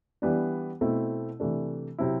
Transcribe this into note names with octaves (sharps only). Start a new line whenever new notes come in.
E3 G3 B3 D4
B2 A3 C4 E4
C3 E3 A3 D4
C3 F#3 C4 E4